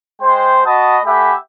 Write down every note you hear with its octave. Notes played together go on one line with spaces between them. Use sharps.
G#3 C5 G5
F#4 D#5 A5 B5 D#6
A3 G4 E5 F#5 G#5 B5